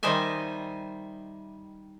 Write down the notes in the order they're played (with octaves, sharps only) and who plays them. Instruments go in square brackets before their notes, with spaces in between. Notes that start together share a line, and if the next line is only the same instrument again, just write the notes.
[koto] D#3 G3 C5 D#5 E5 G#5